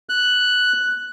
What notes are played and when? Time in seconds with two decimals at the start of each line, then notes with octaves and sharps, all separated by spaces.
0.09 F#6